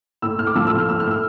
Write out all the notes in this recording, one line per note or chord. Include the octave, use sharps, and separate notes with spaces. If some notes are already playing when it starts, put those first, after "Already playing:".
A2 E6
A2 F6
D6
F3 E6
E6
A2
F6
A2 E6
F6
A2 E6